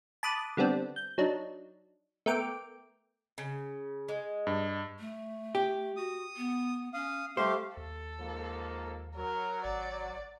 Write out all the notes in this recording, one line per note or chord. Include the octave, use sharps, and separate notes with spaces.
A5 B5 D6 D#6 F#6
D3 G3 B3 C4 D4
G6
F#3 D4 D#4
A3 B3 A#4 G5 D6
C#3
G#3
G2
A3
G4
F#4 D#6
B3
C#4 F5 D#6
G3 A3 G4 C5 F5
D#2 A4
G#2 F3 A#3
F#3 A#4
G#1 D5